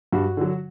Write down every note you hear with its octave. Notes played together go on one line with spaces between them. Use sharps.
G2 F#4
D3 F#3